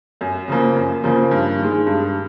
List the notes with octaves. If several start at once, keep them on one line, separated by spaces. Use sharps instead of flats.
F#2
C#3 F3 A#3
F#2
C#3 F3 A#3
G2
D#3 G#3
G2